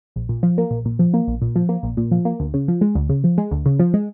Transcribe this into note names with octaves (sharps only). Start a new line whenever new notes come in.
A#1
A#2
F3
A#3
A#1
A#2
F3
A#3
A#1
A#2
F3
A#3
A#1
A#2
F3
A#3
D2
C#3
F3
G#3
D2
C#3
F3
G#3
D2
C#3
F3
G#3